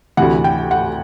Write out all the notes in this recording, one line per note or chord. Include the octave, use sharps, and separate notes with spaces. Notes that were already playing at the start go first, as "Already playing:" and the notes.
D2 C3 E3 F#5
G5
F#5